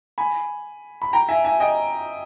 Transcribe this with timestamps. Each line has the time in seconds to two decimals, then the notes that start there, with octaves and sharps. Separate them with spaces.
0.18 G#5 B5
1.02 B5
1.13 G5 A#5
1.29 E5 G#5
1.45 E5 G#5
1.60 D#5 G5